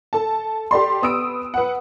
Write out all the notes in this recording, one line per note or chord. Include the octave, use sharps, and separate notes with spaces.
A4 A5
G4 A4 D5 C6
B3 D#6 E6 D7
B4 F#5